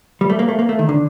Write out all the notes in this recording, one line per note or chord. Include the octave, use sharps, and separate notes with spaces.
G3
A3
A#3
A3
A#3
A3
D#3
D3